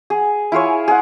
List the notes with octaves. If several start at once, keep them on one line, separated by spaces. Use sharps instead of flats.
G#4
E4 F4 G#4 C#5
G#4 F#5